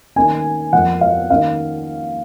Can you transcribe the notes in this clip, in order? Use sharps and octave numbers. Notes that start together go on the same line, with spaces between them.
D#3 A#3 C#4 G#5
F2 F3 A#3 F#5
F5
D#3 A#3 C#4 F5